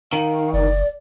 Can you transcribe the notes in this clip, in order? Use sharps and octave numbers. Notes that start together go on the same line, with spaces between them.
D#3 F5
F#1 D5